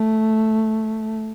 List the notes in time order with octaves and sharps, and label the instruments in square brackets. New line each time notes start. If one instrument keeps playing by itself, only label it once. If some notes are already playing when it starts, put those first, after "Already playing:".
Already playing: [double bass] A3